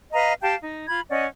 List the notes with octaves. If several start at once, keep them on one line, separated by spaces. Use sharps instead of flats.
B4 D#5 F5 A#5
G4 F5 G5 A5
D#4
F4 B5 G#6
C#4 D5 D#5 F#5